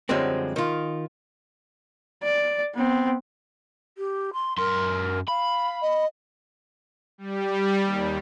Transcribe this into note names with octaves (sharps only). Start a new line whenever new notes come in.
F#2 D3 F3 G3 G#3 C4
D#3 F4
D5
B3 C4
G4
C6
F#2 A#4 C6
F5 B5
D#5
G3
D#2